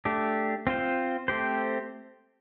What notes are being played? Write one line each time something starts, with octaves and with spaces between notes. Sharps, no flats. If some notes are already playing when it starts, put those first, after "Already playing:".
A3 D4 G4
C4 F4 C5
A3 C4 G4 C5